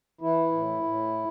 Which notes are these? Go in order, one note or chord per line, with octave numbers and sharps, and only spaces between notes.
E3 E4
A2
A2